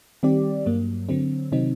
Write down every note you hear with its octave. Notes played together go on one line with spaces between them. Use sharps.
D#3 G3 C4 G4 D5
G2 F#3 A#3
D3 F#3 C4
C3 D#3 F#3 C4 D#4